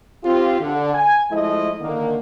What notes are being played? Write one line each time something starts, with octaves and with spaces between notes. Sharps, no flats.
C4 F4 G4
D3
G#5
F3 G#3 A3 E4 F4 D#5
D3 D#3 A#3